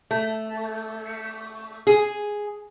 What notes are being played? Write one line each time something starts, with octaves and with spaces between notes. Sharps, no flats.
A3
G#4